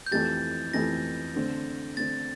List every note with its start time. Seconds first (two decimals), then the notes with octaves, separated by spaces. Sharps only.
0.06 G6
0.11 F2 E3 A3 E4 G4 A6
0.73 F2 E3 A3 E4 G4 A#6
1.35 D3 A3 C4
1.97 D3 A3 C4 A6